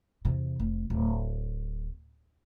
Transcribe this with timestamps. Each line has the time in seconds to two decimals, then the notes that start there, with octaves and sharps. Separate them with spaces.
0.25 E2 C3
0.60 F1
0.90 D1